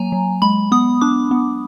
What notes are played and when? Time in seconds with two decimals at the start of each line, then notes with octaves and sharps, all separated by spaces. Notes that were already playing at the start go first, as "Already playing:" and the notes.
Already playing: F#3 A#3 G#5 A#5
0.12 F#3
0.42 G#3 B5
0.72 B3 D#6
1.01 D4 D6
1.31 B3